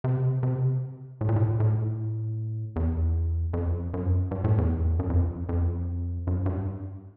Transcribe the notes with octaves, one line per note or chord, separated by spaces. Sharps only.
C3
C3
A2
A#2
A2
A2
E2
F2
F#2
G2
A2
E2
F#2
F2
F2
F#2
G2